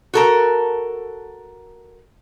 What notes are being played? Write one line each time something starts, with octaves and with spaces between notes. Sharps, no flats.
F#4 A4 A#4